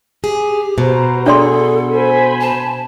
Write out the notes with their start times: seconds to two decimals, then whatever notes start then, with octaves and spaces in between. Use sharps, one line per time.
0.24 G4 G#4
0.78 B2 C5 A#5
1.26 D4 G#4 A4 D5 C6
1.92 C5 G#5 B5
2.41 A5